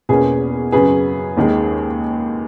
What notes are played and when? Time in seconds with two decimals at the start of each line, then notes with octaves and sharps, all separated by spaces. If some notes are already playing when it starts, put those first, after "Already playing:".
0.09 E2 B2 A#3 C#4 G#4 B4
0.72 F#2 C#3 F#3 G#4 B4
1.37 D#2 D#3 G#3